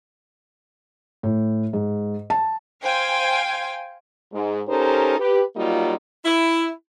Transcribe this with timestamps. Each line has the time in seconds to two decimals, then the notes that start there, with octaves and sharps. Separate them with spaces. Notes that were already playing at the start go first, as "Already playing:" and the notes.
1.23 A2
1.73 G#2
2.30 A5
2.83 C5 F5 G5 G#5
4.33 G#2
4.68 C#4 D#4 G4 A4 A#4 C5
5.19 G4 B4
5.56 F#3 G3 A#3 D#4 F4
6.25 E4